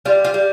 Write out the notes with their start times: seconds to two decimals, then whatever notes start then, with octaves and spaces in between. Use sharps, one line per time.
0.05 G3 F4
0.25 F4
0.34 G3